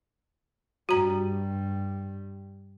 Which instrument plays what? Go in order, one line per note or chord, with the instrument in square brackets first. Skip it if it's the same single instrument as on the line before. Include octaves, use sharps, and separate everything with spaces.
[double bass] G2 G3 [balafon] F#4 A#5